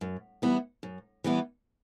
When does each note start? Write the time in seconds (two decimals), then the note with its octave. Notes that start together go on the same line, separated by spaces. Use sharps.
0.01 F#2
0.42 E3 G3 B3 E4
0.83 F#2
1.24 E3 G3 B3 E4